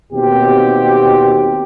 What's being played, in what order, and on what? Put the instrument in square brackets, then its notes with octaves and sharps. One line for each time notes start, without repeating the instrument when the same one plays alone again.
[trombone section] D#2 B2 C4 G4